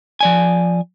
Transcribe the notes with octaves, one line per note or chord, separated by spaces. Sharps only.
F3 D5 G#5